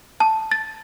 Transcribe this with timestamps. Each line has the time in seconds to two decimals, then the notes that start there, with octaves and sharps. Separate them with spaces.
0.20 A5
0.52 A6